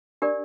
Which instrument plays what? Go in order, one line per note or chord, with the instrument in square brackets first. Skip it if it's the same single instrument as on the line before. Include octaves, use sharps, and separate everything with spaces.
[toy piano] D4 G4 A#4 D5